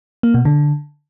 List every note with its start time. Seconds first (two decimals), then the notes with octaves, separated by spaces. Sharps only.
0.23 A#3
0.34 B2
0.45 D3